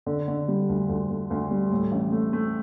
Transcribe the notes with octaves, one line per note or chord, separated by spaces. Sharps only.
D3
D3
G3
D2
D2
D2
D2
G3
A2
A1
A3
A3